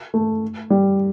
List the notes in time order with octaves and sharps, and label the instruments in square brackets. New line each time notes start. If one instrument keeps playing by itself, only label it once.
[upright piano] A3
G3